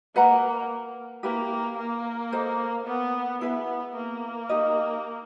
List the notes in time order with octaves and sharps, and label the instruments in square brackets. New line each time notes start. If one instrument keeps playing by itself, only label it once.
[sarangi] A#3 [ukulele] B4 D#5 F#5 A#5
[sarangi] A#3 [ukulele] E4 G4 B4
[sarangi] A#3
[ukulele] A4 C5 D#5
[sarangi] B3
[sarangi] B3 [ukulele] E4 G#4 B4 E5
[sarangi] A#3
[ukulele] D#4 G4 A#4 D#5